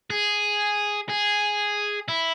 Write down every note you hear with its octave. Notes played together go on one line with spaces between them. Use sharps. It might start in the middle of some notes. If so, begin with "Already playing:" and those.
G#4
G#4
E4